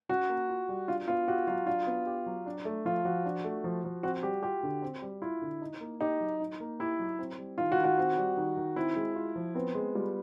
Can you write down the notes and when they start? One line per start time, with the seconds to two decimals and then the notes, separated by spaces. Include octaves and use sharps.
0.09 C#4 F#4
0.29 A#3
0.49 F4
0.69 G3
0.88 D4 F4
1.08 B3 F4
1.28 F#4 G4
1.47 F#3 F4
1.67 D4 F4
1.87 B3
2.06 G4
2.26 F#3
2.46 D4
2.65 A3
2.85 F3 F4
3.05 F3 F#4
3.25 D4
3.44 A3
3.64 F3
3.84 F3
4.03 C4 F#4
4.23 G3 G4
4.43 F4 G4
4.63 D3
4.82 C4
5.02 G3
5.22 E4 F4
5.42 D3
5.61 D#4
5.80 A#3
6.01 D#4 G4
6.20 F#3
6.40 D#4
6.60 A#3
6.79 E4 G4
6.99 F#3
7.19 C4
7.38 G3
7.58 D#3 F4
7.72 F#4
7.78 D#3
7.84 F#4
7.98 C4
8.18 G3
8.37 D#3
8.57 D#3
8.76 C4 E4
8.96 G#3
9.16 F4
9.36 F3
9.55 B3 C4
9.75 G#3
9.95 G3 F4